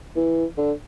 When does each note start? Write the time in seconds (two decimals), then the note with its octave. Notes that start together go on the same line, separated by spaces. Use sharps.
0.16 E3
0.57 D3